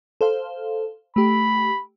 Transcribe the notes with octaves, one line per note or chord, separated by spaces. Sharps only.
A4 C5 F5
A3 G4 B5